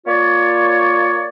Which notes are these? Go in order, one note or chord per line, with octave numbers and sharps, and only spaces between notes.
A#3 F4 C#5 D5